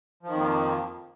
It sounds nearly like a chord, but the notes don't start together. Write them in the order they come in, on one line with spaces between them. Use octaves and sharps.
F3 D#3 F2 A#3